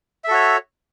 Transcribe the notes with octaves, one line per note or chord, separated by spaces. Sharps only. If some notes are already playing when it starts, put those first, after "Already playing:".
F#4 A4 C#5 E5